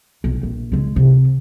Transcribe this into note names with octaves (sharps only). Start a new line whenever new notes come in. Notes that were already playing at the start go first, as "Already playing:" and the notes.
B1
A#1
C#3 G#3
C3